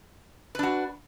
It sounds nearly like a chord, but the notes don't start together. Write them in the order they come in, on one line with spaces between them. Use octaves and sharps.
B4 D4 F#4